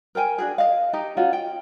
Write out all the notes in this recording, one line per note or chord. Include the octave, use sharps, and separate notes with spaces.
A#4 C5 G5 G#5
D4 F#4 G#4
D#5 F5
D#4 G4 D#5 A#5
C#4 D#4 F4 F#4
G5